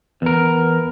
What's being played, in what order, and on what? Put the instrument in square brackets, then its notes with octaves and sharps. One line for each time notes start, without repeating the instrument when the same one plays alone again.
[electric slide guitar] E2 A#4 [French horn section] B3